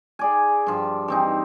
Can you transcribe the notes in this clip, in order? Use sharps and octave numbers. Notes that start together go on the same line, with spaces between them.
G#4 D5 G#5
G2 F3
E3 C4 D#4